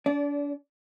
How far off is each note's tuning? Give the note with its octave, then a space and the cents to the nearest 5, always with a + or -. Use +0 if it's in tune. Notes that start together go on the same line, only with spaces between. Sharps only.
D4 -40 D5 -20